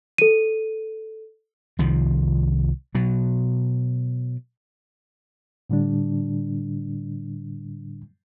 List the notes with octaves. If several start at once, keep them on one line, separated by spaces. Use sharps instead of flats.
A4 D#7
C2 D#3 F3
B2 F#3
A2 D3 G3 D4